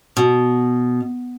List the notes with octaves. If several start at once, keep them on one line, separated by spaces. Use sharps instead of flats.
B2